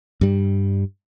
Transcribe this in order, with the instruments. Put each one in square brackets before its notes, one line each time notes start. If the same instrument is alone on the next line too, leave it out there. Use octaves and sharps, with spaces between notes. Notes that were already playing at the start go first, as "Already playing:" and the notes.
[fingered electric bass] G2 G3